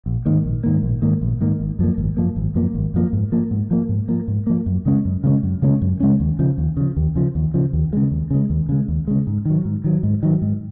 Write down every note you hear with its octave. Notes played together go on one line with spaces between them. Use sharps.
A#1
G#2 D#3 A#3
A#1
G#2 D#3 A#3
A#1
G#2 D#3 A#3
A#1
G#2 D#3 A#3
G#1
F#2 F3 A#3
G#1
F#2 F3 A#3
G#1
F#2 F3 A#3
G#1
F#2 F3 A#3
G#2
F3 A#3
G#2
F3 A#3
G#2
F3 A#3
G#2
F3 A#3
F#2
C#3 G#3 C#4
F#2
C#3 G#3 C#4
F#2
C#3 G#3 C#4
F#2
C#3 G#3 C#4
D#2
C#3 F3
D#2
C#3 F3
D#2
C#3 F3
D#2
C#3 F3
D#2
C#3 G#3
D#2
C#3 G#3
D#2
C#3 G#3
D#2
C#3 G#3
G#2
D#3 F#3
G#2
D#3 F#3
G#2
D#3 F#3
G#2